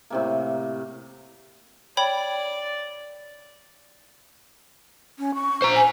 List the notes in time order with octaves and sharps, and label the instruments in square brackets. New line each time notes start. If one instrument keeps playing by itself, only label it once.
[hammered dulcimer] A2 C3 A#3
[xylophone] C#5 G5 B5 [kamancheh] D5
[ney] C#4
C#6
[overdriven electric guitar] C5 A#5
[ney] G#5